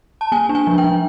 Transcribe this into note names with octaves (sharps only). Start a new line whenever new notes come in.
A5
A#3 G#5
D4
G#5
F3
G5
F3